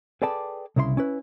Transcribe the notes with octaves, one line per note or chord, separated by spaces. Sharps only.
G#4 A4 B4 D5 G5 A5
C2 C#3 E4 C5 C6
C#4 E4 B4